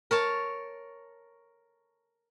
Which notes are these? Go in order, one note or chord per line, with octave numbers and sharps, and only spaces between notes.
A#4 C#5 A5